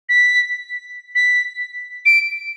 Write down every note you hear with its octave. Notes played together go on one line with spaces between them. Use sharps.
B6
B6
D7